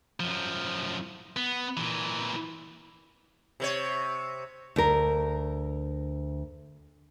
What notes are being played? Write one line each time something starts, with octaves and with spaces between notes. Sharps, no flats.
F#2 F3
B3
A#2 E3
C3 B4 C#5
D2 A#4